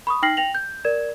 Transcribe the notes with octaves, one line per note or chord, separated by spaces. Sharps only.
B5 C#6 D#6
D#4 G5 F6 A#6 C7 F#7
G5 A#6 F7 F#7
G6
A#4 D5 G#6 E7